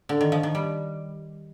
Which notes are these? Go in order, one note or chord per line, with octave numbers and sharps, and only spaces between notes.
D3
D#3
F3
D#3
G3